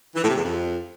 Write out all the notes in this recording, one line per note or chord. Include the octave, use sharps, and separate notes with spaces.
E3
A2
C3
E2
F2